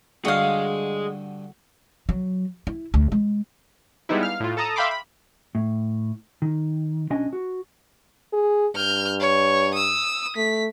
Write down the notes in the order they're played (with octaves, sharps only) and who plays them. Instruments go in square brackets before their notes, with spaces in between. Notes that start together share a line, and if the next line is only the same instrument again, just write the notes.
[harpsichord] G2 D3 D#6 [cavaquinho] F#4 F5 [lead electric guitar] G#4 D#5
[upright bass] F#3
E4
D2
G#3
[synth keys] G3 G#3 B3 D#4 E4
F5 F6
A2 F4
A4 A5 A#5 D#6
E5 F5 G5 B5 C6 D6
B5
[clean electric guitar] A2
D#3
B1 C#4 D4 D#5 G#5
F#4
[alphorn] G#4
[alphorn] G2 [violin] F6 G6
[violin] C#5
D#6 E6
[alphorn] A3 [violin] B6